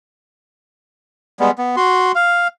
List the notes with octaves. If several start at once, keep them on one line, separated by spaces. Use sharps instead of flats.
G3 G#3 B3
B3
F#4 C6
F5